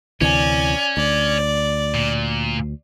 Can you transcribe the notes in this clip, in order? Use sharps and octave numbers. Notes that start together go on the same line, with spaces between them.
D2 C3 E3 C#4 D5 G#5
D2 D5
A#2